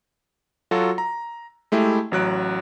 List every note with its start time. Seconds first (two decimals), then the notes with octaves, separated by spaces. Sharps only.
0.71 F#3 F4 F#4 A4
0.98 A#5
1.72 G#3 A3 E4 G4
2.12 A1 F#3 F#6 D7